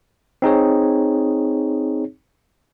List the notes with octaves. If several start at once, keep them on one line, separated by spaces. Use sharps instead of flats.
C4 D#4 G#4 C#5